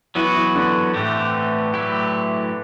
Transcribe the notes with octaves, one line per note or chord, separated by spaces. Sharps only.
E3 F#3 B3 F#4 B4
E3
D3
A2 E3 A3 C4 G4
F#3 A3 E4 G4